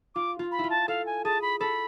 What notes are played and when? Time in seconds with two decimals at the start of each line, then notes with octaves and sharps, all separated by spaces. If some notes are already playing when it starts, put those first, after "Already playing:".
0.15 F4 D6
0.39 F4
0.52 B5
0.59 E4
0.64 F4
0.70 A5
0.88 A4 F5
1.06 G#5
1.25 G#4 A5
1.42 B5
1.60 A4 B5